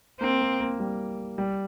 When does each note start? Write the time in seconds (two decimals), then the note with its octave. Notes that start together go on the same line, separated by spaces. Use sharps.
0.20 A#3 C4
0.41 A#3
0.60 A#3
0.80 G3
1.38 G3